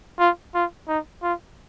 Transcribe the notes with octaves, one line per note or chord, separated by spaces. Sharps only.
F4
F4
D#4
F4